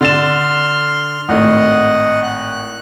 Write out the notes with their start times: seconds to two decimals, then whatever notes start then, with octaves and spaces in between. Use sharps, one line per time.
0.01 D3 C6 F6 A6 E7
1.29 G#1 A2 D#5 F#5
2.23 F#6